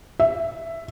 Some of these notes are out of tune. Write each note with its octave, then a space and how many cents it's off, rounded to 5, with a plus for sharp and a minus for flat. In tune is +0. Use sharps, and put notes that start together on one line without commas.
E5 +10